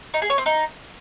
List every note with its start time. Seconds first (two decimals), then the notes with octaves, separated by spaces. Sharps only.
0.14 D#4
0.22 G#4
0.30 C#5
0.38 C4
0.46 D#4